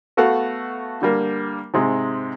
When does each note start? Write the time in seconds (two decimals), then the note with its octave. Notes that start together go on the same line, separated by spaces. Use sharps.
0.17 A3 B3 F#4 A4 F5 F#5
1.02 D3 G3 A#3
1.74 G#2 C3 G#3